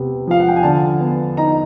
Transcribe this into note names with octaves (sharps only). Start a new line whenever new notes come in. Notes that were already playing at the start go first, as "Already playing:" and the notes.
Already playing: C3 B3
F3 F5
F#5
G5
G#5
D3 A5
B3
D#4 A#5